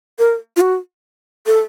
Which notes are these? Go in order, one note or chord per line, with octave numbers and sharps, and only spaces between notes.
A#4
F4
F#4
A4